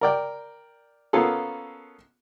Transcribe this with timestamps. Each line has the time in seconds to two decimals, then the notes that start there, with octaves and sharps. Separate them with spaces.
0.01 A#4 D5 G5
1.13 A#3 B3 C#4 F4 G#4 A4